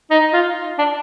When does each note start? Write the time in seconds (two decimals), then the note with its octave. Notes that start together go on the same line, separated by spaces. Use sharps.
0.11 D#4
0.33 F4
0.79 D4